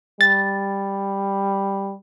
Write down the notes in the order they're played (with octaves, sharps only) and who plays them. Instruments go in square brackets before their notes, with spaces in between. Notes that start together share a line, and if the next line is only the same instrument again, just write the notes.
[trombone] G3 [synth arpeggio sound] A6